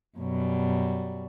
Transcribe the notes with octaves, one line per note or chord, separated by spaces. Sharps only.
F#2 B2 F#3 G3